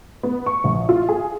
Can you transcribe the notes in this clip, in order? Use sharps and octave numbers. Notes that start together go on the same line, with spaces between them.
B3
C#6
A#1
F4
G#4